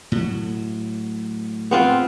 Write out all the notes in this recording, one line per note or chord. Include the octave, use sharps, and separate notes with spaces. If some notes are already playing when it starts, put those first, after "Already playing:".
A2 F#3
B3 C4 F4